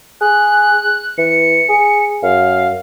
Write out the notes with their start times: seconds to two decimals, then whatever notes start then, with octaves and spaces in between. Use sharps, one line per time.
0.21 G#4 F#6
1.18 E3 C#7
1.69 G#4
2.22 F#2 F5